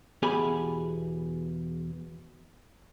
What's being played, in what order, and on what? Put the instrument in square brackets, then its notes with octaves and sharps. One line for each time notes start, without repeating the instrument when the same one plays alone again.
[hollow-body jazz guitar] E2 B2 G4 G#4 G#5 B5